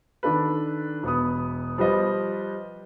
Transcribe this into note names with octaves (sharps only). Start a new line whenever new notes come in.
D#3 D4 A4 B4
E1 B3 D#6
F3 G3 B4 D#5